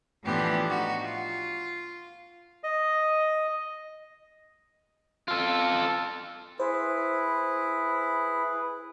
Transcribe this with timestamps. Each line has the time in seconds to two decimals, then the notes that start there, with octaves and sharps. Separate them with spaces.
0.24 A2 E3 F3 B3 D4 G4
0.70 D#4 F#4
1.03 F4
2.64 D#5
5.28 F4 A4
6.60 E4 G#4 B4 C5